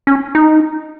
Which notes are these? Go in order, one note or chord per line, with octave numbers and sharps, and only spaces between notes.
C#4
D#4